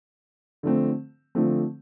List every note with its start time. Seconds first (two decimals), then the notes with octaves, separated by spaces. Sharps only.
0.63 D3 F3 A3 C4
1.35 D3 F3 A3 C4